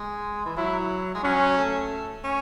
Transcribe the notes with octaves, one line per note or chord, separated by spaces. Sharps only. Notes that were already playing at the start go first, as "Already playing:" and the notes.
Already playing: G#3
E3
F#3 E4
G#3
F#3 C#4
A3
C#4